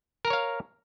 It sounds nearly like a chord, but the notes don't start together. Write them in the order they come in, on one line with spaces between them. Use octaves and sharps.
A#4 A#5 C#5 F5